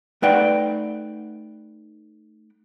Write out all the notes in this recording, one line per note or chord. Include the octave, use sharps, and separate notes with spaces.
A3 D#4 B4 D5 F#5 G5